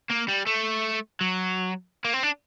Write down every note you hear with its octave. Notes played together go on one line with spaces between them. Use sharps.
A#3
G3
A3
F#3
A#3
C4
D4